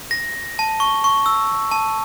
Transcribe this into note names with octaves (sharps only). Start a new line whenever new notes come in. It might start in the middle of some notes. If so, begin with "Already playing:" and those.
A#6
A5
C#6
C#6
E6
A5